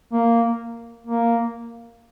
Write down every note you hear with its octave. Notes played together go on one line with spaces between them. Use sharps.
A#3
A#3